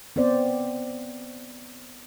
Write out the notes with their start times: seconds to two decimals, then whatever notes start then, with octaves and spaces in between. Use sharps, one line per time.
0.16 B3 C4 C5 D5